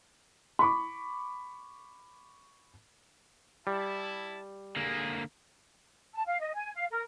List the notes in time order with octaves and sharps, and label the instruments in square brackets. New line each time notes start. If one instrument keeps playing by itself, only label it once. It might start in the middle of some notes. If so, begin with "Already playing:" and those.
[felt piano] B5 C#6 D6
[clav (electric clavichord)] G3 [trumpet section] E4 A5
[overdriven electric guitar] D3 A#3 [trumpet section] G#4
[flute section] A5
F5
D#5
G#5
F5
A#4